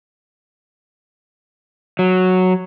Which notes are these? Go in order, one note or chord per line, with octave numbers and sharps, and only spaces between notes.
F#3